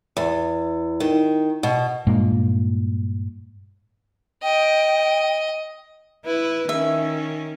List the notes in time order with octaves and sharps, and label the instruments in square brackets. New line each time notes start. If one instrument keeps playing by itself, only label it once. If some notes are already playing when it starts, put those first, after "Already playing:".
[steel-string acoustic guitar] E2
D#3
B2
[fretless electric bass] G2 A#2 G#3 A#3
[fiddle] D#5 [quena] G5
[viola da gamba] E4 B4
[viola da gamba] D#3 C#4 [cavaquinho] E5